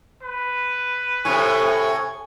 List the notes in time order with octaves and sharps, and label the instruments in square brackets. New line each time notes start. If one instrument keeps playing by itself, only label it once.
[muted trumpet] B4
[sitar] A2 C3 [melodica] G#5 C#6